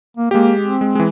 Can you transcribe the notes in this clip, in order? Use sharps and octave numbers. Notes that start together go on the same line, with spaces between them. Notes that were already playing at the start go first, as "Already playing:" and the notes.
A#3
G#3 A#3 G4
C4
G#3
E3 G#3